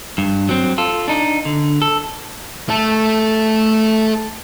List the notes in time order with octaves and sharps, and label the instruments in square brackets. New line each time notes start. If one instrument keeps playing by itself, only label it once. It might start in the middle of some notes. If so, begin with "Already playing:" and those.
[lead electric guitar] G2
F#3 C4
F4 A4
D4 D#4
D3
A4
A3 A4